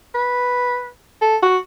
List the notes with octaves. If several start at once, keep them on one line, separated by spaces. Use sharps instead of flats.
B4
A4
F#4